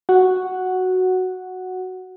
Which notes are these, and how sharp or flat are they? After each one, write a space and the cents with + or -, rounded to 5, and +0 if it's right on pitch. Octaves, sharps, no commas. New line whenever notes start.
F#4 +0 F#5 +0